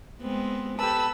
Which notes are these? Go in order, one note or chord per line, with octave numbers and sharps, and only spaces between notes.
G#3 B3 C4
G4 A4 B4 A5 B5 E6